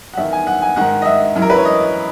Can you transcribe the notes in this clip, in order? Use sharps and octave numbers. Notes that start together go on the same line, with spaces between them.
F#5
E2 D#3 E5
G#5
F#5
G#5
G#2 D#3 F#5
D#5
E5
F#2 E3
A#4
B4
C#5
D#5